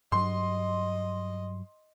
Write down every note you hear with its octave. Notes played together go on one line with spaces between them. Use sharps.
G2 F#3 D#5 C6